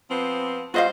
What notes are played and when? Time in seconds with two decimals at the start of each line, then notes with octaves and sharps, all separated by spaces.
0.10 F3 B3 C4
0.74 G3 F4 F#4 C5 D#5 F5